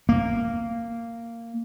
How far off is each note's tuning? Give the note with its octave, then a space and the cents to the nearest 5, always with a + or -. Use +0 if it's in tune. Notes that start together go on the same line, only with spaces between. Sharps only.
A#3 -10